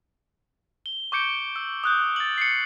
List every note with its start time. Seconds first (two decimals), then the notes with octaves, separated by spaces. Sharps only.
0.86 G7
1.12 C#6 D6 G6 C#7 D7 G7
1.56 E6
1.84 D#6 F#6 G6
2.16 A6 F#7
2.38 C7 C#7